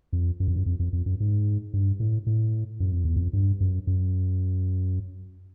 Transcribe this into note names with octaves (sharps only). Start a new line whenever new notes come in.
F2
F#2
F2
F#2
F2
F2
F2
F#2
G#2
G2
A2
A2
F#2
F2
E2
F2
G2
F#2
F#2